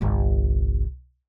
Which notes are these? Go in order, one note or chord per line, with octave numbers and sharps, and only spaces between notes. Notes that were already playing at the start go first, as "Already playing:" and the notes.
G1 C2